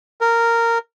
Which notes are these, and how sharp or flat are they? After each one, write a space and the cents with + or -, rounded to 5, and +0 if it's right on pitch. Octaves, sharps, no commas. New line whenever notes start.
A#4 -10